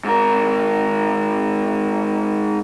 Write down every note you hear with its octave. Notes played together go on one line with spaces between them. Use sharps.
G#2 A#4